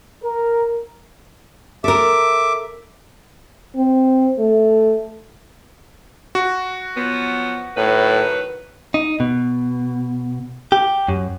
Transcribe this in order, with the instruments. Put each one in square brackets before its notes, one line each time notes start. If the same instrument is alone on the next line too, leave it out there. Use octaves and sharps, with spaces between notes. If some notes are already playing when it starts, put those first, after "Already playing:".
[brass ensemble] A#4
[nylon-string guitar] A4 A#4 [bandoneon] E5 D6
[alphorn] C4
A3
[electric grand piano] F#4
[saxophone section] F3 F#3 B3
[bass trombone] A2 [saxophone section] D#3 F#3 B4
[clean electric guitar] D#4
B2
G4
F#2